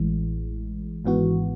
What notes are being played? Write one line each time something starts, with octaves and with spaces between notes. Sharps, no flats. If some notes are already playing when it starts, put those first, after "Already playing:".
Already playing: A1 A2 E3 G#3
G#1 G#2 E3 B3 F#4